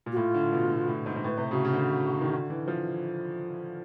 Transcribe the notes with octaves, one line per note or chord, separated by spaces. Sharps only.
A#2
F#4
A2 F4
D3
B2
B2
A2
G#2
G#2
A2 B4
C3
C#3 F#4
C#3
D3
C#3
D#3
D3
E3
F3